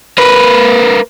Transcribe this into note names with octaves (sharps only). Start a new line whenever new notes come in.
A#3 B4